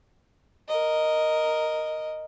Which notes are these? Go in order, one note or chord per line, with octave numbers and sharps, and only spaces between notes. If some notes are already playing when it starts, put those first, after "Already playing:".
A#4 D#5